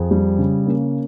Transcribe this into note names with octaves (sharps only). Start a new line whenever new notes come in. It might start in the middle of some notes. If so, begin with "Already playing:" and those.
Already playing: F2 G#4
G3
C#3
A#3 C#4